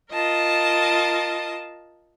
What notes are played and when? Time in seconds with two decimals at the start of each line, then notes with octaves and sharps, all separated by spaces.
0.13 F4 A#4 D#5 A5